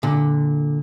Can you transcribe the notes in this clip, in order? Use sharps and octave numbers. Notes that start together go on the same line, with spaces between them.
A#2 D3